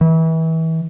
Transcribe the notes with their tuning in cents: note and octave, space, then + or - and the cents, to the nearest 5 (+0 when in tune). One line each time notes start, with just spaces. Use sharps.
E3 -30